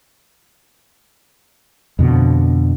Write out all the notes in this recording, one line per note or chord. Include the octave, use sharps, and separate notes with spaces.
F2 B2 D3